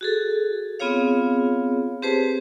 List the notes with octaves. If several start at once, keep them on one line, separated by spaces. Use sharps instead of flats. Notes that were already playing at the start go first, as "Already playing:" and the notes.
F#4 G#4 A4
B3 C4 F4 G#4 C#5 F5
C4 G4 G#4 B4 C5 A5